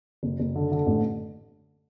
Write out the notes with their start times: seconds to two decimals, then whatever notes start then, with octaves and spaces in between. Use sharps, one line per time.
0.23 F#1
0.39 F#1
0.55 D3
0.72 D3
0.87 A1